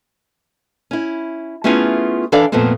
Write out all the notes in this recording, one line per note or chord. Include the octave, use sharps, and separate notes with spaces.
C#4 E4
A3 B3 C#4 E4 F4 G#4
E3 D4 A4 D5 F5
F2 A#2 F3 A3 B3 C4